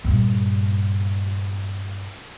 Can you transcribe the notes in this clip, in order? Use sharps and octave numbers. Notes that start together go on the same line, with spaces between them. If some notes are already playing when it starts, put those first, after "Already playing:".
G2 A#2